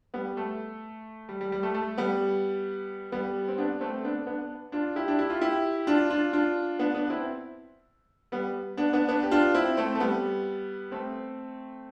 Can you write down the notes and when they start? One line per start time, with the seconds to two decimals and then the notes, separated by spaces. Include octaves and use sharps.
0.14 G3 B3
0.37 A3
1.29 G3
1.41 G3
1.52 G3
1.63 A3
1.74 A3
1.98 G3 B3
3.12 G3 B3
3.48 C4
3.58 B3 D4
3.81 A3 C4
4.04 B3 D4
4.27 B3 D4
4.72 D4 F4
4.96 E4 G4
5.08 D4
5.19 E4
5.30 F4
5.41 E4 G4
5.87 D4 F4
6.10 D4 F4
6.33 D4 F4
6.79 B3 D4
6.95 B3 D4
7.10 C4 E4
8.32 G3 B3
8.77 B3 D4
8.93 B3 D4
9.08 B3 D4
9.23 G4
9.31 D4 F4
9.54 C4 E4
9.77 A3 C4
9.95 A3
10.00 G3 B3
10.92 A3 C4